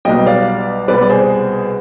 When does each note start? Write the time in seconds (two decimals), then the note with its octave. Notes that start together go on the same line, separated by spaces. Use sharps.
0.05 B1 B2 G3 D#5 G5
0.26 D5 F5
0.88 C2 B2 G3 B4 D5
1.02 D5
1.09 G#4 C5